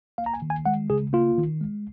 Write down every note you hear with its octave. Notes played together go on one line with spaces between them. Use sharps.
A#3 F5
A#5
G#5
D#3
G#5
G#3 F#5
C#3 G#4
A#3 F4
D#3
G#3